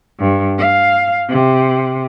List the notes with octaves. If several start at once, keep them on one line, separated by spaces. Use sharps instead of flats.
G2
F5
C3